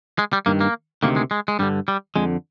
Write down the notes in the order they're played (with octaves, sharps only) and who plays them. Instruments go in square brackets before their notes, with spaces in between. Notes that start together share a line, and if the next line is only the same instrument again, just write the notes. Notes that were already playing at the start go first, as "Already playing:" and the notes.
[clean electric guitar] G#3
G3
G2 D#3 A#3
A#3
D2 C3 D#3 A#3
G#3
G#3
G#3
G2 D3 G3
G3
F2 D3 G#3